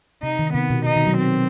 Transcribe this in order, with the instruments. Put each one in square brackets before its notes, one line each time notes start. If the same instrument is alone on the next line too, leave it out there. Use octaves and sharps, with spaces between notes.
[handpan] C3 [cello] D#4
[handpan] D#3
[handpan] C3 [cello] B3
[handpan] B2
[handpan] C3 [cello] D#4
[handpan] D#3
F#3
[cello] C4